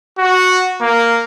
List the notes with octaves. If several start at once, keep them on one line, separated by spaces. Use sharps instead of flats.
F#4
A#3